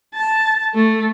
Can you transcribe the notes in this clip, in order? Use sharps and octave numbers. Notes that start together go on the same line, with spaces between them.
A5
A3